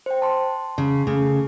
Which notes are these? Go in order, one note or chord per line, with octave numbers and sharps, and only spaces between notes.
C5 G5
A5 C6
C#3
C#3 A3